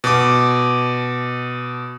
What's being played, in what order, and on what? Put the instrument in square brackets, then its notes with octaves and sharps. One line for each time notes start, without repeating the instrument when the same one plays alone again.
[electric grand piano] B2 D6